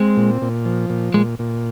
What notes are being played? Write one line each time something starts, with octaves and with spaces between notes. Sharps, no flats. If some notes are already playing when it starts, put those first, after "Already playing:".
Already playing: G#3 C4
A#2
A#2
F3
A#2
A#2 G#3
A#2